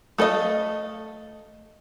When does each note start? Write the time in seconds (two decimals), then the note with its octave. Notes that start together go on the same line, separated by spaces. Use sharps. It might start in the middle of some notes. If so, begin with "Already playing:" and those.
0.18 A3 A4 B4 D#5 F5